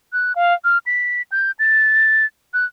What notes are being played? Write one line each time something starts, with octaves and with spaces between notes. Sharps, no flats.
F#6
F5
F6
B6
G6
A6
F#6